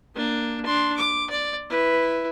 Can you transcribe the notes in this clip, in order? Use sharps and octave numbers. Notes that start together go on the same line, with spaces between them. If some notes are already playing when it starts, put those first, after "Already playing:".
A#3 D4
D4 C6
D6
D5
E4 B4